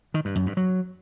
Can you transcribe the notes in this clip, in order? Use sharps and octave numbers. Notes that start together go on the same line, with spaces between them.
D#3
G2
F#2
G2
F#3